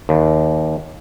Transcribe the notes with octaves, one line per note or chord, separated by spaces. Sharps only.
D#2